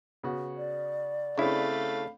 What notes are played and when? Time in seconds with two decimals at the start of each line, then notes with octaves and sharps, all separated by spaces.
0.23 C#3 B3 F#4
0.57 D5
1.38 C#3 A3 C4 D4 E4 F5 B5